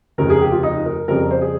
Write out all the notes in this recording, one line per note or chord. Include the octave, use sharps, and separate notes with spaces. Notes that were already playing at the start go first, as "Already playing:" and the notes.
F1 D#2 C#3 A#4
G#4
G4
F4
D#4
A#4
F2 C#3 G3 C4 A#4
C5
G#4